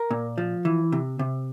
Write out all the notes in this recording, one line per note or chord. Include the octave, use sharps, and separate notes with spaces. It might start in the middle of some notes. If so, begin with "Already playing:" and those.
Already playing: A#4
A#2
F3
E3
C3
C3